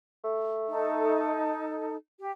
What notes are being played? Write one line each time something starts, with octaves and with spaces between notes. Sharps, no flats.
A3
D#4 A4
G4